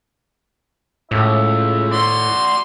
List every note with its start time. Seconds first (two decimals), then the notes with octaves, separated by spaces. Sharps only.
1.11 C#2 A2 E5
1.92 F#4 D5 C6